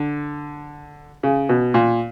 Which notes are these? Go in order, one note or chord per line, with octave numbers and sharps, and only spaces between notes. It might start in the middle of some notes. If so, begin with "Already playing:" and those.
Already playing: D3
C#3
B2
A#2